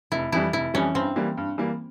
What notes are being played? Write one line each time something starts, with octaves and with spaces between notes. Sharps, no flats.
F1 E4
F2 E3 G3 E4
F1 E4
F2 E3 G3 C#4
G2 C4
E3 G3 A#3
G2
E3 G3 A#3